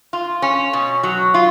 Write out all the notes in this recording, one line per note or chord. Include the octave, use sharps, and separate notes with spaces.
F4
C#4
B2
F#3
F4